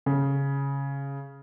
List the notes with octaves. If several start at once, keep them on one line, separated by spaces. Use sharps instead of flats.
C#3